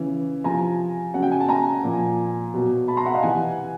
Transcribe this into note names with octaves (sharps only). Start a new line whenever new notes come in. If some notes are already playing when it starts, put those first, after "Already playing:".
Already playing: C#3 E3
C3 F3 G#5 A#5
C#3 F#3 F#5
G5
G#5
A5
G#5 A#5
A#2 F3
B2 F#3
A5 B5
A#5 C6
E5 F#5
D#5 F5
C3 E3 F#5 G#5